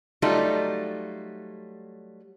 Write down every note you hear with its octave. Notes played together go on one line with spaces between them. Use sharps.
F#3 G3 A3 D#4 F4